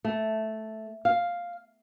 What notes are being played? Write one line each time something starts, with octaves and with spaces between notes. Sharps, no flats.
A3
F5